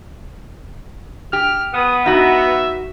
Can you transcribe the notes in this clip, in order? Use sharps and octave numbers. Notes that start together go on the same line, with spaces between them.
G4 F6
B3 D#6
D#4 F#4 E5